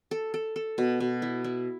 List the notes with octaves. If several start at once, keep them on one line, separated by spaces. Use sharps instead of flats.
A4
A4
A4
B2
B2
E4
E4